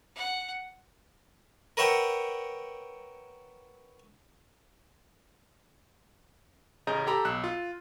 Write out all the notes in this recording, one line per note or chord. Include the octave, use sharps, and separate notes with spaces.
F#5
A#4 B4 C#5 E5 F#5 G5
A1 C#3 G#4 D#5 A#5 G6
G4 A4 A#5 B5
B1 E6 F#6 E7
F4